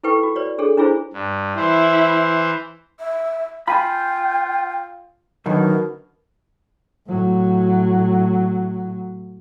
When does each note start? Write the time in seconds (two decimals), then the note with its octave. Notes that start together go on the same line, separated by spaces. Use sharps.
0.04 E4 A4 B4 G5 C#6
0.23 F#4
0.36 B4 C#5 D5
0.58 D4 G#4 A4 C#5
0.78 D4 E4 F4 G#4 B4 C5
1.14 G2
1.57 E3 E4 C5
2.99 E5
3.68 F4 G5 G#5 B5
5.46 F#2 B2 D3 D#3 A#4
7.07 A2 F#3